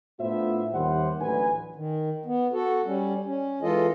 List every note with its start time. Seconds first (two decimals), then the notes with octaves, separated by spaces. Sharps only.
0.20 A2 B3 D4 F4 C5 E5
0.74 D#2 G3 C5 E5 F#5
1.21 A1 D2 F#3 D4 B4 G#5
1.76 D#3
2.26 B3
2.53 F#4 A4
2.86 G3 C#4
3.25 C#4
3.62 E3 G#3 F4 A4 D#5